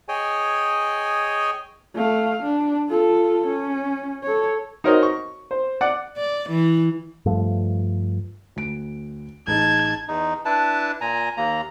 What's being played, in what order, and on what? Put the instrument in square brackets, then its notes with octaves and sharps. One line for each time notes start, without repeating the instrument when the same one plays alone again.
[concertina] G#4 C#5 D#5 G5 G#5
[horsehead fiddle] A3 F5
D4
F4 A4
C#4
A4 C#5
[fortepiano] D#4 F#4 A#4 C5 C#5 D#5
C#6
C5
D5 F#5
[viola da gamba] D5
E3
[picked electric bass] G2 F3 A3
[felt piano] D2 D7
[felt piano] A1 D#4 G#4 [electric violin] A5 G#6
[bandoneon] E2 D#4
D4 E4 B4 A5
A#2 G#5 A#5
D#2 A#3 A#5